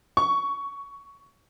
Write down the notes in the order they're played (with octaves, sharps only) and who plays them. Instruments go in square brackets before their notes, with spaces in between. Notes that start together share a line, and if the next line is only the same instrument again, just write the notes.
[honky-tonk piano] C#6